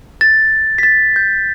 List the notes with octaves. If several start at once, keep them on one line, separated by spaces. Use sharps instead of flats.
A6
B6
A6
G6